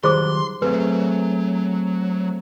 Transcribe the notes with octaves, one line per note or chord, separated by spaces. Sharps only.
D#3 F#3 G3 G#4 C5 C6 D6
F#3 A3 C4 G#4 B4